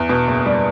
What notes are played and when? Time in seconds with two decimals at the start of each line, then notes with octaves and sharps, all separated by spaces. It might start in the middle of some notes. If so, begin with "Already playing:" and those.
Already playing: E2
0.09 B2
0.27 F#1
0.46 G3